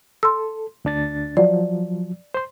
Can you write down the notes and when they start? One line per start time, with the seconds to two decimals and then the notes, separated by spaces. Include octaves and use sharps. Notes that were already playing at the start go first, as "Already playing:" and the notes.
0.23 A4 C6 E6
0.85 D2 D4 A6
1.37 F3 F#3 D5
2.34 C5 C6